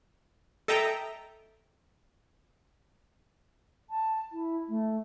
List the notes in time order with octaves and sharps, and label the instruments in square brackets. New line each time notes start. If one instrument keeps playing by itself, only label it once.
[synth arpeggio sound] A4 D#5 E5 G5 A#5
[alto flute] A5
E4
A3